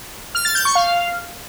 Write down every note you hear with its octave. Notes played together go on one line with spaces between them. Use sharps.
F6
A6
G6
C#6
F5